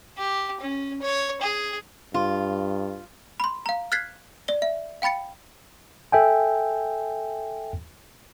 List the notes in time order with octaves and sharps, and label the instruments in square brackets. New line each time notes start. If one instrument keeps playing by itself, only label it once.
[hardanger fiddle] G4
C#4
C#5
G#4
[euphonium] G2 [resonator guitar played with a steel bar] F4
[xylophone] B5 C6
F5 A#5
F6 F#6 G#6 A6 B6 C7
D5 G7
E5
F5 G5 B5 A6 C#7
[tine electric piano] A4 E5 G5 G#5